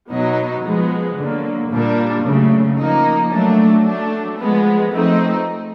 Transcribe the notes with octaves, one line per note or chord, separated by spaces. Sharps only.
B2 F#3 B3 D#4
F3 G#3 B3
D3 F#3 A#3
A#2 G3 A#3 D4
C#3 F#3 A3
F3 A#3 D#4
F#3 A3 D4
F#3 A3 D4
F3 G#3 B3
F3 A3 C4 D#4